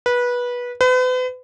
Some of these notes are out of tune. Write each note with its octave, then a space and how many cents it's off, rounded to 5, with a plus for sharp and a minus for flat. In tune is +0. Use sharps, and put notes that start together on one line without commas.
B4 -20
B4 +40